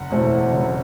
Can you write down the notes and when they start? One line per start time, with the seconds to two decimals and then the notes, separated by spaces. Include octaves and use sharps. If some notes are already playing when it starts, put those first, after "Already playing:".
Already playing: F#1 F#5
0.10 E2 B2 A3 C4
0.52 F#1